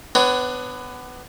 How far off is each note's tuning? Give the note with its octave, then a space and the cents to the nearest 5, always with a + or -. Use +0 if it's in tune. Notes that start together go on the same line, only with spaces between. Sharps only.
B3 +20 D4 +20 C#5 +0